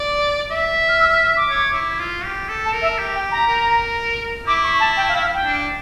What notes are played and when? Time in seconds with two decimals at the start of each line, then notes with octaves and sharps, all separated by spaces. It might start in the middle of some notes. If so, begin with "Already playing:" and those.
Already playing: D5
0.51 E5
0.89 F6
1.00 E6
1.12 F6
1.37 D6
1.49 C#5
1.73 E4
1.99 F4
2.24 G4
2.49 A4
2.65 A5
2.73 A#4
2.82 E5
2.98 G4
3.15 G5
3.32 A#5
3.47 A#4
4.46 E4 D6
4.64 C#6
4.80 A5
4.97 G5
5.09 F5
5.21 F5
5.34 G5
5.45 D4